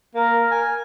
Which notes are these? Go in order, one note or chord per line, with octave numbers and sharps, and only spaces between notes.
A#3 A#4
G#5